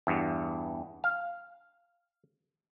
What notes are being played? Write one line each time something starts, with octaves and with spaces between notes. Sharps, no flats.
E2 G2
F5